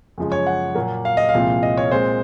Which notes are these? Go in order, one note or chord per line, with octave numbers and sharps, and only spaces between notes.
F#2 C#3 F3 G#3
C#5
F#5
A#2 F#3 A#3
F5
D#5
F5
C2 A#2 F3 G#3 C4
D#5
C#5
A#2 G#3 C4 C5